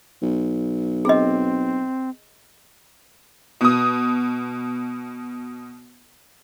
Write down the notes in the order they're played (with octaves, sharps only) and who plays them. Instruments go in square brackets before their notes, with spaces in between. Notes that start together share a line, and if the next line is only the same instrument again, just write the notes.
[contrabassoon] B1
[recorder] C4 [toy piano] G#4 D#5
[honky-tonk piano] B2 D#6